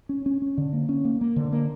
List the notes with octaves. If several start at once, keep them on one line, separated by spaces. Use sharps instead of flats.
C#4
C#4
C#4
D3
A#3
C#4
A#3
A#3
D3
A#3